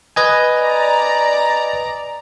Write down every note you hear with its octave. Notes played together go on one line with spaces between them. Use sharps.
B4 D#5 G#5
D5 A#5